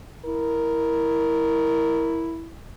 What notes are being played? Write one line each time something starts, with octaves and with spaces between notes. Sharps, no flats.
E4 A#4